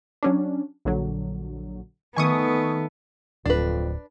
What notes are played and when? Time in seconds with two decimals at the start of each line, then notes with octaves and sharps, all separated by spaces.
0.23 F#3 C#4 D4
0.85 A#1 D3 F#3
2.16 D#3 A3 B3 G#5 C#6 D#6
3.46 D1 F2 D4 B4